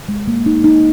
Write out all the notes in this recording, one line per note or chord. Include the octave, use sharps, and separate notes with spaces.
G#3
A#3
D#4
D#4